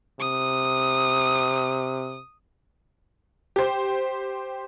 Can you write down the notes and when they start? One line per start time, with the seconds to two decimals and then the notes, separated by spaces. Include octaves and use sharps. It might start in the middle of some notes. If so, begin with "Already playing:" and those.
0.20 C3 D#6
3.56 G4 C5